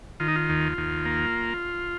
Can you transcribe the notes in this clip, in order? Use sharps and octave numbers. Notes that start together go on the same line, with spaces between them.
D#3 F4
D#4
F4
D#2
D#2
A#3